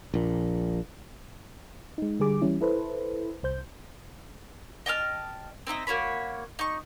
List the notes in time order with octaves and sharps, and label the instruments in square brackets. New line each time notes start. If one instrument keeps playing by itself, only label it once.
[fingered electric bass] A#1 A#2
[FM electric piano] G#3 D#4
D3 G3 G#4 D6
E3 G3 C#4 E4
E4 A4 B4 C5
C2 C5 G6
[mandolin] D#5 G5 A5 F6
C4 D#4 E4 D#5
A#3 F#4 C#5 B5
D#4 C#6